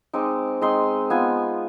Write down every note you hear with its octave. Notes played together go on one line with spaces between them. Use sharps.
G#3 C4 D#4 D6
G#3 C4 D#4 C6
B3 F4 G#5